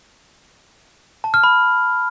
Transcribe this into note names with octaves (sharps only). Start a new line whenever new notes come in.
A5
F6
B5